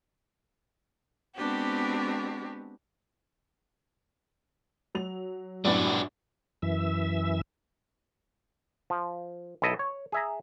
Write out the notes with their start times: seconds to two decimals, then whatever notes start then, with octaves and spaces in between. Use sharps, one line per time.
1.37 G#3 B3 C4 D4 F#4 G4
4.95 F#3 F7
5.65 F#2 A2 G3 B3 D4 F#4 D5
6.62 F#2 E3 E5
8.90 F3
9.62 B1 E4 A4 D#5
9.79 C#5
10.12 G#4 E5 A#5